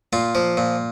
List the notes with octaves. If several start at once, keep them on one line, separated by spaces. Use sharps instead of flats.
A#2 F4
F3
A#2